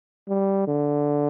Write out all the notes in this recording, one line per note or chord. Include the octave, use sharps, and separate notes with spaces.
G3
D3